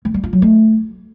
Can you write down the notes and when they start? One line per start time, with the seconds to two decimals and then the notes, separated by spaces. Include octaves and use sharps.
0.05 G#3
0.14 G3
0.23 F4
0.33 F#3
0.42 A3